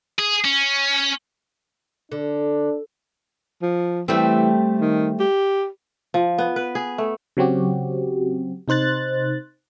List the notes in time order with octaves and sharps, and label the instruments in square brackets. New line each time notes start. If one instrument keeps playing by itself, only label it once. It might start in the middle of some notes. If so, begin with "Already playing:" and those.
[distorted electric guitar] G#4
C#4
[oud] D3 [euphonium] D4
[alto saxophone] F3
[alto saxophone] E3 [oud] G3 A3 C4
[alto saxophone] D#3
G4
[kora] F3
B3
B4
G#4
A3
[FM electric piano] C#3 F#3 C4 F#4 G4
C3 D#4 C5 F#6 A6